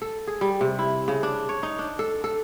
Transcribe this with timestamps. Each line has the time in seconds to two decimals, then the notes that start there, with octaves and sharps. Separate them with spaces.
0.02 A4
0.27 G#4
0.41 G3
0.61 C3
0.79 E4
1.08 C#3
1.23 D4
1.49 C#5
1.63 D#4
1.79 D4
1.99 A4
2.24 A4